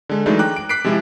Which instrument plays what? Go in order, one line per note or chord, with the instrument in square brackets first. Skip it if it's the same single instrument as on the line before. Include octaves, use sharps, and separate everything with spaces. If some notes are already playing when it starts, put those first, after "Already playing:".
[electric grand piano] D3 G#3
E3 F#3 G#3 A3 D4 D#4
G5 A#5 D6 F#6
D7
D6 F#6 B6 C7 D7
C3 F3 G#3 E4